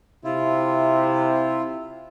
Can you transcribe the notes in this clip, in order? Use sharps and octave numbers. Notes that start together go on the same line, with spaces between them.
C3 E4 F4